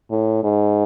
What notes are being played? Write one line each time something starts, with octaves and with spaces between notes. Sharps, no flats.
A2
G#2